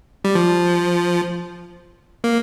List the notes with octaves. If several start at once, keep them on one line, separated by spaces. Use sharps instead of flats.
G3
F3
A#3